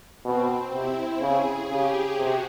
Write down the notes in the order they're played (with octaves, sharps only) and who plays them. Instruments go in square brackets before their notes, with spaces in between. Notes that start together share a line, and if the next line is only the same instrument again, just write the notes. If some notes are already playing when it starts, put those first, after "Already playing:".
[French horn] B2 [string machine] C4
[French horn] C3 [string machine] E4
[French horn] C#3 [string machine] G#4
[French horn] C#3 [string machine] G4
[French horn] C3 [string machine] F#4